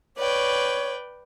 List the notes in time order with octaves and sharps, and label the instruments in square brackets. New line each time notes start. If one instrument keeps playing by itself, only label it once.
[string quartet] B4 D5 G5 [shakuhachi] C#5